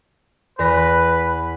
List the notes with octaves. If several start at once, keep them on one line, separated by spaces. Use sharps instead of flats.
E2 B4 A#6